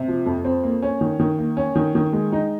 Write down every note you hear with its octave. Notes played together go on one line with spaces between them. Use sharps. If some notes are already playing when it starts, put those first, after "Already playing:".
Already playing: C3
F3
F2
C4
A#3
C#4
D#3
D#3
A#3
C#4
D#3
D#3
G#3
D#4